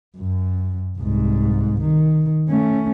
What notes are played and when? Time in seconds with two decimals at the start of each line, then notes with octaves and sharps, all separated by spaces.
0.18 F#2
0.98 C2 G#2
1.81 D#3
2.49 A3 C#4